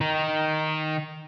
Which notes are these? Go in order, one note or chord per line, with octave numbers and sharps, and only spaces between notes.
D#3 D#4